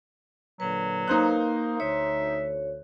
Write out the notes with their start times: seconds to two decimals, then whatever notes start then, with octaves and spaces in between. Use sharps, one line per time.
0.60 A#2 D3 F#3 B4
1.08 A#3 D#4 C5 F#6
1.80 D2 C#5 E5